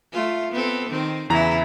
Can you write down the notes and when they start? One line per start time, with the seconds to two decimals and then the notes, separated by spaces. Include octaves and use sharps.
0.13 A3 F4
0.52 B3 C4 A4
0.89 D#3 C4
1.30 E2 C#3 E3 E4 A#5